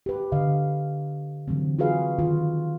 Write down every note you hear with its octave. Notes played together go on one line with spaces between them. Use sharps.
G4 B4
D3 D#5 F5
D3 E3 F#3 A3 C4
F4 F#4 G#4 B4 F5
D#3 F4